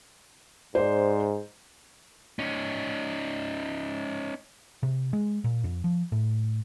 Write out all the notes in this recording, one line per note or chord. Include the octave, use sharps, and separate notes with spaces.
G#2 C5 D5
C#4 D#4
C3
G#3
A#2
F2
F3
A2